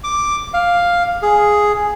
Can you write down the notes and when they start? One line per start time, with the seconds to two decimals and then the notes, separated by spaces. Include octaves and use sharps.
0.04 D6
0.54 F5
1.22 G#4